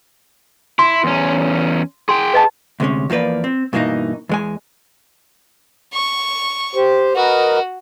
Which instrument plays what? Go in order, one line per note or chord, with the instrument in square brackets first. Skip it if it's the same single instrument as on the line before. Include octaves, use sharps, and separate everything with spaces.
[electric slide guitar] E4 [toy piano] C6
[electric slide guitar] E2 C#4
[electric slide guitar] G#4 G5 [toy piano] C6
[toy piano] B4 D#5 A5
[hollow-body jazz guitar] D2 C3 G#3 C#4
E2 F3 A#3 B4 D5
C4
G2 B2 E3 A#3 D#4
E2 G#3 G#5
[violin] C#6
[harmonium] G4 C5
[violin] F#4 [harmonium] A#4 B4 D#5